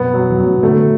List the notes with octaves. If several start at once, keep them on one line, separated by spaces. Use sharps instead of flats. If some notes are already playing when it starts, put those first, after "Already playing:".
Already playing: F#2 B2 B3
F#3
E2
F#2 F#3
A2
B2
A2 D3 A3